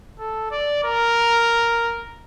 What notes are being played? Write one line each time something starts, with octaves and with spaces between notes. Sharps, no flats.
A4
D5
A#4